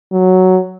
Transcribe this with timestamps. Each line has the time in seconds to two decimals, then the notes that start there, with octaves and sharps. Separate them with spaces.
0.11 F#3